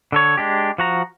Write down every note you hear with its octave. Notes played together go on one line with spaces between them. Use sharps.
D3 A4 C#5
G#3 D4 G4
F3 F#4 A#5